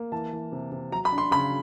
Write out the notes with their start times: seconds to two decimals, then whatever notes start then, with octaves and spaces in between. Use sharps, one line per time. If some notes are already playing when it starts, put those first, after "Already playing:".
Already playing: A#3
0.12 E3 A5
0.33 E3
0.52 C3
0.72 C3
0.92 F#3 A#5
1.05 B5
1.12 D4
1.18 C6
1.31 C#3 B5